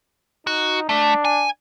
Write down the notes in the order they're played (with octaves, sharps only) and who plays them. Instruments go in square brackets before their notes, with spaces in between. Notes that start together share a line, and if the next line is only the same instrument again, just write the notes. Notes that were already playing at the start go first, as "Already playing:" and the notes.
[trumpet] D#4 [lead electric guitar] F#4
[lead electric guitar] A3 [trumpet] D4
[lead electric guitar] G#5